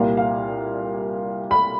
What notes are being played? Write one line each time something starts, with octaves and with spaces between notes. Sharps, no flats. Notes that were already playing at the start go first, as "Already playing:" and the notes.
Already playing: C2 A#2 G3 A#3 F5
F5
B5